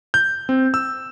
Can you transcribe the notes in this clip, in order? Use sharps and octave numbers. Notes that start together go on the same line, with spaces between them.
G6
C4
E6